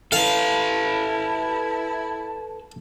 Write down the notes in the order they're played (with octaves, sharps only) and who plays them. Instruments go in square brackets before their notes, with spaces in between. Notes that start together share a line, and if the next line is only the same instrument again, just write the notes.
[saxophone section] E4 [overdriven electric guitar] A4 B4 [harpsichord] F5 [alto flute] A5